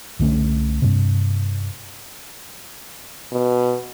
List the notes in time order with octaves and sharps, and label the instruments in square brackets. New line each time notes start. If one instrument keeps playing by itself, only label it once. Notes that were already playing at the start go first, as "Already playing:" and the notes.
[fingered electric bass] C2 D3 A3 C#4
G2 C3
[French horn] B2